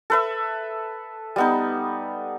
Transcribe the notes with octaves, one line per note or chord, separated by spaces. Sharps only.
A4 B4 E5
G3 B3 D#4